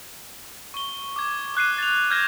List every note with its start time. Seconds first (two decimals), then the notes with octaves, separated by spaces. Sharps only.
0.74 C#6 G7
1.16 D6 G#6
1.55 D6 F#6 C7 D#7
1.78 A6 F7
2.10 F6 G6 G#6 A#6 E7